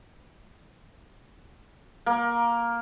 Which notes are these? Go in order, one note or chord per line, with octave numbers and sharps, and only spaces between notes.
A#3